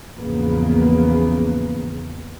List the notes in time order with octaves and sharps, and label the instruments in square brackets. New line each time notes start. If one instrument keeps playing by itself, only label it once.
[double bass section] G#1 E2 C#3 F3 A#3 B3